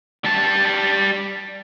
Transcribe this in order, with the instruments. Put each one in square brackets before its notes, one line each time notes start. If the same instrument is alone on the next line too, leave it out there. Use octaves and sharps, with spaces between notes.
[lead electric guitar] G3 A5